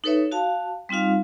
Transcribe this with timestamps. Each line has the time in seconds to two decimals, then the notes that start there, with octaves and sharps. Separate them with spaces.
0.04 D#4 A4 B4 C#5 E5
0.32 F#4 F5 A5
0.89 G3 C4 D#4 F4 F5